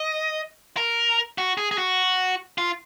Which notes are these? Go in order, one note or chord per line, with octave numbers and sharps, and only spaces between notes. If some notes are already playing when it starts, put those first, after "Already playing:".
Already playing: D#5
A#4
F#4
G#4
G#4
F#4
F4